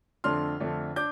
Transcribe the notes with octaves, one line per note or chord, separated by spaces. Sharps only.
F2 D3 A3 D4 C6 F6
F2 D3 A3 D4
D4 D6 G6